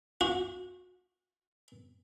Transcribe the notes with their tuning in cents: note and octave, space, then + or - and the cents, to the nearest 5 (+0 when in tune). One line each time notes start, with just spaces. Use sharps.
F#4 -30